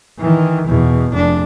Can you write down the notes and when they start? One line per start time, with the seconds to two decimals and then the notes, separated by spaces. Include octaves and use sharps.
0.18 D#3 E3
0.67 E2 B2
1.10 F1 D4